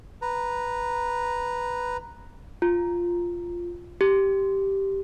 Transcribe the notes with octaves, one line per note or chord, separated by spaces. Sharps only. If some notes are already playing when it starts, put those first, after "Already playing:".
B4 A#5
F4
G4